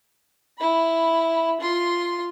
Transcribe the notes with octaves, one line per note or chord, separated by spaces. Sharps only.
E4 B5
F4 C6